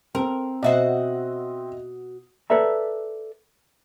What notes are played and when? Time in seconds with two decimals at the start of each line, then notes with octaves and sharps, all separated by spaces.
0.15 C4 A#4
0.63 B2 F#4 C5 D#5 E5
2.50 A4 B4 D5 E5 A#5